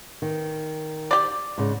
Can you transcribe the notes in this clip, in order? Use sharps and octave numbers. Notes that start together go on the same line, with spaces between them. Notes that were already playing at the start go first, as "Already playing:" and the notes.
D#3
G4 D5
G#2 C#3